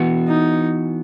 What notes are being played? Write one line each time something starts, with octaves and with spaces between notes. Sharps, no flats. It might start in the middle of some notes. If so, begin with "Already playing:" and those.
Already playing: E3 B3 F#4
D#4